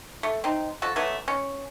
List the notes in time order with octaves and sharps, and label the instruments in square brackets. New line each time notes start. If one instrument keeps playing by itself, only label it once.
[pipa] A3
C4 D#4
F3 F#4 A4
E3 F#3 A3 B3
C#4